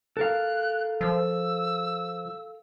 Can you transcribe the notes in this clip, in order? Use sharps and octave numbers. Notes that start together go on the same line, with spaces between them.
A4 A#4 F5 F#6
F3 E6